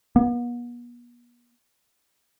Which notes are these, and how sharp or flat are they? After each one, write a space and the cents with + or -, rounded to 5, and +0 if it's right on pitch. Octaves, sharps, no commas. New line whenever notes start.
B3 -40